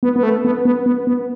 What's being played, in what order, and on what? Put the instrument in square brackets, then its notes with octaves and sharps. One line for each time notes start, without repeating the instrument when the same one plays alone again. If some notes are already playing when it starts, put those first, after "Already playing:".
[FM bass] B3
B3
A3
B3
B3
B3
B3